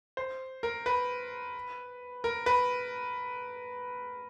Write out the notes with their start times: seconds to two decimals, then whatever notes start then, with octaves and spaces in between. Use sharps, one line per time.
0.17 C5
0.63 A#4
0.86 B4
2.24 A#4
2.46 B4